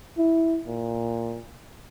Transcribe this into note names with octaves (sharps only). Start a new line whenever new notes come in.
E4
A#2